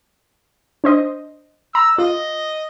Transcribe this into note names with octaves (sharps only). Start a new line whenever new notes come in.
D4 C5 D#5
A#5 E6
F4 D#5